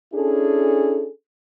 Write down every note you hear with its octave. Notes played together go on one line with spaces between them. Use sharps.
C#4 D4 E4 G#4 A4